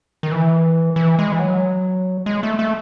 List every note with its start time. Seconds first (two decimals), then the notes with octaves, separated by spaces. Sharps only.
0.23 D#3
0.32 E3
0.96 E3
1.19 G#3
1.32 E3
1.39 F#3
2.26 G#3
2.43 A3
2.59 A3